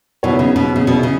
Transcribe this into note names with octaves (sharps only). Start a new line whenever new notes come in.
G#2 B2 F#3 B3 E4 C#5
C#3
B2
C#3
B2 F#3 E4 G#4 C#5
C#3